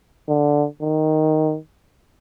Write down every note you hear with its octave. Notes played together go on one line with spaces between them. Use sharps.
D3
D#3